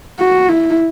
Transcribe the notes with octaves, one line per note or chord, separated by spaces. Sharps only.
F#4
E4